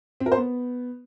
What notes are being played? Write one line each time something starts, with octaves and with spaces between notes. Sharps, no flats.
C4
A#4
C5
B3